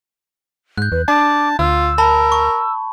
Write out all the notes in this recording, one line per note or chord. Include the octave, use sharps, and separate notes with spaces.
G#2 F#6 G6
E2 B4
D4 A5 D6
D2 F4 E6
A#4 A5 B5
C#6